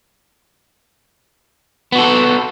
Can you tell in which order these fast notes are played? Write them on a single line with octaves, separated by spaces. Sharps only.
B3 F#4 A4